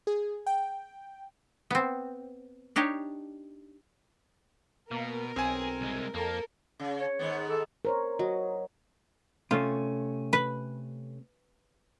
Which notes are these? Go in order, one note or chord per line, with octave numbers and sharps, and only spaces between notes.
G#4
G5
B3 C4
D4 D#4 G4 C#5
B2 A#3 A#4
B1 C4 G#4 G#5
C2 G#3
F2 A#3 A4 A#4
C#3
C#5
G#2 D#3 B3
A4
A#4 C5 C#5
F#3 D#5
C3 A3 C#4 F4
B4